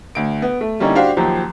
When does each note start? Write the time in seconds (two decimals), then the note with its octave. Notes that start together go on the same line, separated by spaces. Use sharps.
0.15 D2 D7
0.42 B3
0.61 A3
0.80 D3 G3 A#3 C#4 D#4 E4
0.95 D4 F#4 G4 C5 F5
1.17 D#2 F3 F#3 G4